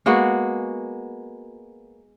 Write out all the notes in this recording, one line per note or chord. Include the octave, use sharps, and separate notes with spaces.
G#3 A#3 B3 F#4